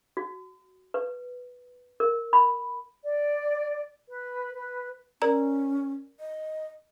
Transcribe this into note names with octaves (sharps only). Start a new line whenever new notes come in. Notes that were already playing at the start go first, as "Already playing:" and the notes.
F#4
B4
A#4
B5
D5
B4
B4
C#4 A#4 D5 A#5
D#5